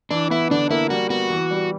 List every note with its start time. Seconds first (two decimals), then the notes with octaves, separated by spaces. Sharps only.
0.11 E3 D4
0.30 B3 E4
0.51 D3 D4
0.71 A#3 E4
0.90 G3 F#4
1.10 B3 F#4
1.30 E3
1.51 G3